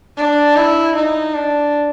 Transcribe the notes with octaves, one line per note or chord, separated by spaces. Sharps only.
D4
E4
D#4
D4